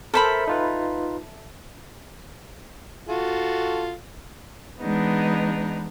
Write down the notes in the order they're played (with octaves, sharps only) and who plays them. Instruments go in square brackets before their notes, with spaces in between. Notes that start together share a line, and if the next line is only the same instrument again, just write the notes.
[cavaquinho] A4 E5 B5 [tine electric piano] A#4 C5 A5
[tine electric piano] D#4 F4 B4
[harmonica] F4 F#4 A4
[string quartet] E3 G#3 B3 D4 D#4